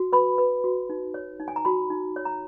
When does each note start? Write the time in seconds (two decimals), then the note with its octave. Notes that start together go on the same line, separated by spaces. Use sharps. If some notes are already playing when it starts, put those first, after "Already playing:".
Already playing: F#4
0.13 B4 B5
0.38 B4
0.64 F#4
0.90 D#4
1.14 C#5
1.40 D#4
1.48 G#5
1.56 A#5
1.65 F#4 B5
1.90 D#4
2.16 C#5
2.25 A#5